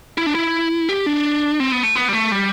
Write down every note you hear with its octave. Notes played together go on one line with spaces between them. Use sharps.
E4
D4
E4
G4
D4
C4
B3
A3
B3
G3
A3
G3